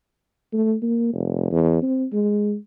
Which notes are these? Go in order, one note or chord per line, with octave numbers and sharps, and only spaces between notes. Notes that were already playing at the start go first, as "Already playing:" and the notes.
A3
A#3
F1
E2
C4
G#3